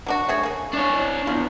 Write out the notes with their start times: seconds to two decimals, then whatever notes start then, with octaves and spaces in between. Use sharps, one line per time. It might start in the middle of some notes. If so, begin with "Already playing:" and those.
0.06 F#3 D4 F#4
0.29 A3 G#4 C#5
0.43 A#3 G#4
0.73 D4 C#5
1.27 E2 F4